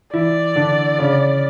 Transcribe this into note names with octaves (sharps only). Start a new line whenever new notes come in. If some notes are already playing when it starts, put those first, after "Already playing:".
E3 E4 D5
D3 D4
C#3 C#4